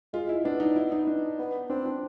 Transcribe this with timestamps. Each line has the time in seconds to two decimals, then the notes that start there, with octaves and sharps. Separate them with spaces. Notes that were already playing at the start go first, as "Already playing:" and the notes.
0.14 G#3 F4
0.29 E4
0.45 B3 D4
0.60 D#4
0.76 E4
0.92 D#4
1.07 D4
1.39 B3
1.70 C4 D4
1.86 D4